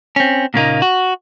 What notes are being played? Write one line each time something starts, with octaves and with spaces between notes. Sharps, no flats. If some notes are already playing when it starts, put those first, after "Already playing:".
C4 C#4
A#2 C#3 A#3 D#4
F#4